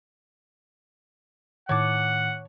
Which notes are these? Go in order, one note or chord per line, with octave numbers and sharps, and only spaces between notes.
A2 D#3 C#5 F#5 A5 D6